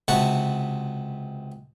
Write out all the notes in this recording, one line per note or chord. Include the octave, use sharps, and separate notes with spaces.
C#2 C3 F#4 F#5 A5